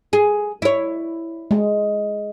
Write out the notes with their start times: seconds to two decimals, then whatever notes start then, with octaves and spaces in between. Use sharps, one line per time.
0.13 G#4
0.62 E4 C#5
1.51 G#3